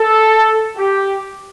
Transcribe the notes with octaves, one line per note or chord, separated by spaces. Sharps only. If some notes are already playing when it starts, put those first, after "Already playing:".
Already playing: A4
G4